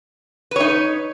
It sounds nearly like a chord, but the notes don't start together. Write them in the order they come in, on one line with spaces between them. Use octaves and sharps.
B4 C#5 D#4